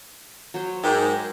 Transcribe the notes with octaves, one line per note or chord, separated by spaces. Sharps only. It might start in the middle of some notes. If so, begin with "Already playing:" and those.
F#3 C5
G#2 G4 A#4